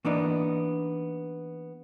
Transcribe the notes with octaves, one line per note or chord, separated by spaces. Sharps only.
E3 A#3 B3 D4 D#4